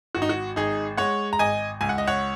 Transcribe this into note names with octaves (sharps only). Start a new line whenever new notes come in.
G#1 F#4
D#4
F#4
G#1 D#4 G#4
G#3 C#5 F#5
A#5
G#1 D#5 G#5
C#2 G#5
F#5
D#5
C#5 F#5